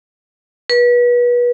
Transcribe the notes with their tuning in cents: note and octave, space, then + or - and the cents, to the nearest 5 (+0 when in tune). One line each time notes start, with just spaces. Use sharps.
B4 -30